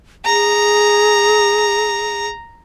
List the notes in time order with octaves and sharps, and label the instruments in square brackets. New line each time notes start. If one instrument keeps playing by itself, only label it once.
[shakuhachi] G#4 [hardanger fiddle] A#5